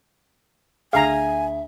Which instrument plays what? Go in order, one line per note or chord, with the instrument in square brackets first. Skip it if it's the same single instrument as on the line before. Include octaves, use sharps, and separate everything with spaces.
[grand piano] D2 G#4 [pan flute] E5 [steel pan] F5 A#5 [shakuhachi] G#5